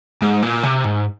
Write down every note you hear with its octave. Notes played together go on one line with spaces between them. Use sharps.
G#2
A#2
C3
G#2